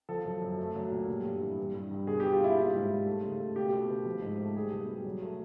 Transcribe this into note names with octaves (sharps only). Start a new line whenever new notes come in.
F3 A4
F#2
F#2
A3
F#3
A#2
G3
G2
E3
G2
G2
G2
B2 G#4
G3 G4
F4
A#3 E4
G3 F4
G#2
G3
A3
C#3
A3
B2 G4
B2
B2
F3
G#2
A3
G3 G#4
B2
G3
F#3
A3